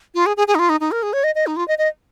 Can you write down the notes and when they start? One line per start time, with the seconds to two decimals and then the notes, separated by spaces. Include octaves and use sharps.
0.15 F4
0.26 G#4
0.37 G#4
0.48 G#4
0.55 D#4
0.59 F4
0.69 D#4
0.80 D#4
0.91 A#4
1.03 G#4
1.13 C#5
1.24 D#5
1.35 D#5
1.47 D#4
1.56 F4
1.68 D#5
1.78 D#5